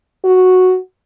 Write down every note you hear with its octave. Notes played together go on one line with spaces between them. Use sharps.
F#4